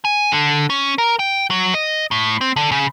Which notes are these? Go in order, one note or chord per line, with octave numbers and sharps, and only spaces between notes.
G#5
D3
C#4
A#4
G5
F#3
D#5
A2
C4
D3
C#3